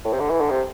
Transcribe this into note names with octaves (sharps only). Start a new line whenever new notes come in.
A2
C3
D3
E3
D3
C3